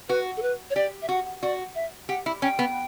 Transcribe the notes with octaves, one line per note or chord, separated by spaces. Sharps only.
F#4 B4
A4
B4
C#5
G4 D5
E5
F#4 F#5
F#4 D5
E5
G4 F#5
E4
C#4 G5
B3